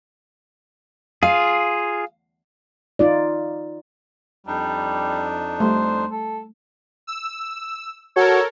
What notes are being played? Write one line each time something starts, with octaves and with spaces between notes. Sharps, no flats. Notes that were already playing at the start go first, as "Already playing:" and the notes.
F4 G#4 F5
D#4 F4 D5
F2 G3 D4 D#4
G3 A3 C5
A4
E6
F#4 A4 A#4 C#5